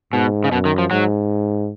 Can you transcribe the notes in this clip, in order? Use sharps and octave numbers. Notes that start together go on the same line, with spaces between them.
G#2 B2
C#3
F#2 B2
D#3
F3
G#2 F#3